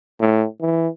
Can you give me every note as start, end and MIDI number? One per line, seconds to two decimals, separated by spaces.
0.20 0.46 45
0.61 0.88 52